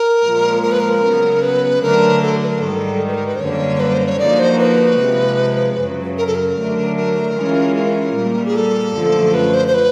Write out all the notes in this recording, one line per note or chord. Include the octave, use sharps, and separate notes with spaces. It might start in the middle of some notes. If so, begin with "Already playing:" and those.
Already playing: A#4
A#2 F3 G#3
A#4
B4
A#4
C#3 F#3 B3
B4
D3 F#3 A3 D4 A#4
A4
B4
A#4
G#2 D#3 G3 A4
B4
A#4
B4
C5
F#2 D3 G3 A#3 C#5
B4
C5
C#5
D3 F3 A#3 D#4 F#4 D5
C5
B4
C3 F3 G#3
F#2 C#3 F#3
A#4
A4
A#4
D3 F#3 A3 D4
A#4
E3 G#3 C#4 F4
A#4
A#2 G3 A#3
G#4
A4
F#2 D3 F3 A3
B4
C5
C5
B4